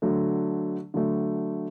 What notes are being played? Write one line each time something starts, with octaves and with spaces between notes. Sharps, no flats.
D3 F#3 A3
D3 F#3 A3